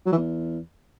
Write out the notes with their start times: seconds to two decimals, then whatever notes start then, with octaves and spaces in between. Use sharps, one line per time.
0.06 F#3
0.12 E3
0.18 E2